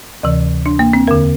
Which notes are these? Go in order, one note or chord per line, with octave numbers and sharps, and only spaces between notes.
D2 C3 E3
D4
A#3
C4
E2 D3 A#4